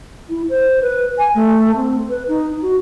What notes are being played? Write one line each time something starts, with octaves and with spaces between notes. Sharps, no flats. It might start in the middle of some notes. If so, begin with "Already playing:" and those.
E4
C5
B4
G#5
A3
C4
B4
D#4
F#4